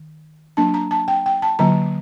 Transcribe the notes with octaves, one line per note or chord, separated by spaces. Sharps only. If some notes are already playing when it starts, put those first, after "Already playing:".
Already playing: D#3
F#3 A#3 D4 A5
A#5
A5
G5
G5
A5
D3 F#3 A#3 A#5